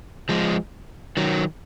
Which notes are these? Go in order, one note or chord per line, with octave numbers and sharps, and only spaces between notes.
F3 G#3
D#3 F#3